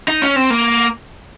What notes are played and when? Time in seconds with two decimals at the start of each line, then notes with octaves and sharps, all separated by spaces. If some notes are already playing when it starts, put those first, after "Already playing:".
0.08 D#4
0.22 C#4
0.36 C4
0.50 A#3